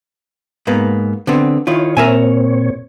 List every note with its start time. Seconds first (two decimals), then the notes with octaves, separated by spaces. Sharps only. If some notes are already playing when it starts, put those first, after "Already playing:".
0.67 G#2 A#3 B3
1.27 D3 B3 C4
1.67 D#3 E4 F4 C#5
1.97 A#2 C4 A#4 C#5 E5 G#5